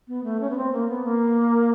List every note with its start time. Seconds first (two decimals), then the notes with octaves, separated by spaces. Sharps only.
0.08 B3
0.24 A3
0.40 C#4
0.50 B3
0.57 C4
0.73 A#3
0.88 B3
1.05 A#3